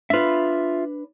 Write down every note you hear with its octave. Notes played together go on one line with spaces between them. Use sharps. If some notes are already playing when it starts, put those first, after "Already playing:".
D4 F4 B4 E5